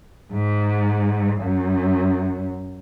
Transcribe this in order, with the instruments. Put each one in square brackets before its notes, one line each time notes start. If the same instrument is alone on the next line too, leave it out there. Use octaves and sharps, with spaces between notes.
[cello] G#2
F#2